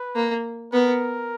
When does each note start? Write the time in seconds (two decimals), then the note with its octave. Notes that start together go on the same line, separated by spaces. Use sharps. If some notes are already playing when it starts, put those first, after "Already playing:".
Already playing: B4
0.15 A#3
0.73 B3 A#4